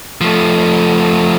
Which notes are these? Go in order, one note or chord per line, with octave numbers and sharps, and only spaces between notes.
F3 A3